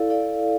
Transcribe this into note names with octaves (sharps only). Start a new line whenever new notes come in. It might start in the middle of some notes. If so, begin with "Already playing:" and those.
Already playing: E4 A4 D5 F5
E4 A4 D5 F5